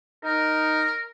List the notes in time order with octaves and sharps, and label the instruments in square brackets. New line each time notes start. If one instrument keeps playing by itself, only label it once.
[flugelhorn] D#4 [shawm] A#4